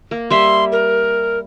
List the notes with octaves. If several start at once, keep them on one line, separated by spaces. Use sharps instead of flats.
A#3
G3 E5 C6
A#4